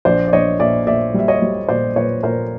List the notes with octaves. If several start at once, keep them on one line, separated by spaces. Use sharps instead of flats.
A#1 C5 D5
D5
A#1 C#5 D#5
A#2 D5 E5
A#2 D5 E5
G3 E5
C#5 D#5
G3
A#2 C5 D5
A#2 B4 C#5
A#2 A#4 C5